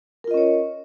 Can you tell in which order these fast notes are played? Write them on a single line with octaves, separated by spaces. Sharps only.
A#4 F4 D#5 C#4 C#5